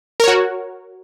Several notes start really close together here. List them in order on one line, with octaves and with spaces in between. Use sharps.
A#4 C#5 F#4